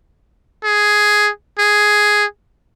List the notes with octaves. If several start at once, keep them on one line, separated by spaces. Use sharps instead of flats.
G#4
G#4